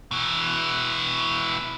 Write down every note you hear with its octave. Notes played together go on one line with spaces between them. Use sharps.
B2 E3